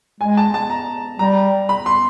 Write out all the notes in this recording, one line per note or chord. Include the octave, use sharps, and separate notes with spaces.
G#3 G#5
A5
A5
A#5
G3 A#5
B5
C6